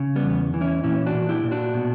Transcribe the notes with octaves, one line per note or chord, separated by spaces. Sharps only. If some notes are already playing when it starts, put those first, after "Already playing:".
Already playing: C#3
G3 B3
E2
E3
C#4 E4
A#2 C#4 E4
D4 F#4
A#2
E4 G4
A#2
D4 F#4
B2